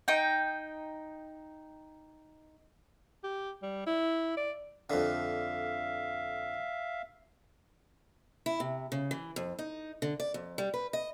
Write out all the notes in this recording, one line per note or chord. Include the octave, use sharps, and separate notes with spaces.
D#4 G5
G4
G3
E4
D5
F2 D3 E5 F5
E4
C3
C#3
E3
F2
D#4
D3
D5
F2
G3
B4
D#5